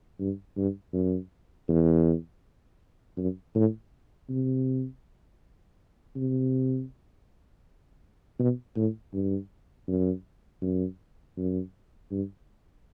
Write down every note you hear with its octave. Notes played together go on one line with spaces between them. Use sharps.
G2
G2
F#2
E2
F#2
A2
C3
C3
B2
A2
G2
F#2
F#2
F#2
G2